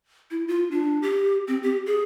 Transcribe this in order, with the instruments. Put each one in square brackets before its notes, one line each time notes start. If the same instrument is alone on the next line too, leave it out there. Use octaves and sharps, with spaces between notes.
[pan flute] E4
F4
D4
G4
C4
G4
G#4